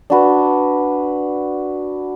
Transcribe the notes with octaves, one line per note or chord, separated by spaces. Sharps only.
D4 F#4 B4